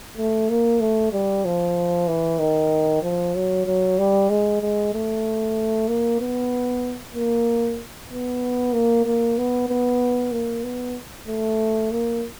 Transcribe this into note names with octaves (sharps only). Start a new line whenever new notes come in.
A3
A#3
A3
G3
F3
E3
D#3
F3
F#3
F#3
G3
G#3
G#3
A3
A#3
B3
A#3
B3
A#3
A#3
B3
B3
A#3
B3
A3
A#3